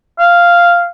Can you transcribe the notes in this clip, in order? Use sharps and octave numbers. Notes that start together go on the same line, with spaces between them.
F5